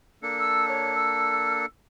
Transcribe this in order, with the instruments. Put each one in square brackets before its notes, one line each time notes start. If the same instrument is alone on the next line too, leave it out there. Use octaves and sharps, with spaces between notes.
[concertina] A#3 D4 A4
[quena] E6
C#5
E6